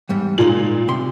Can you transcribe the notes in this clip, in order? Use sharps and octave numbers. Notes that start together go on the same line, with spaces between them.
E2 G#2 G3
A#2 G#3 D#4 F4 F#7
C3 C6